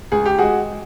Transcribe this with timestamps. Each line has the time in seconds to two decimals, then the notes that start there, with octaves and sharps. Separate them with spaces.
0.12 C#2 G#4
0.26 G4
0.38 G#3 F#4 G#4